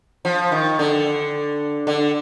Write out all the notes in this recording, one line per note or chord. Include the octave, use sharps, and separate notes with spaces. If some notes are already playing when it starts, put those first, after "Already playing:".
F3
D#3
D3
D3